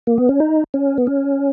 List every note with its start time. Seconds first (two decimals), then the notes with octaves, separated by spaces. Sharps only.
0.07 A#3
0.18 B3
0.29 C#4
0.40 D#4
0.74 C#4
0.98 B3
1.07 C#4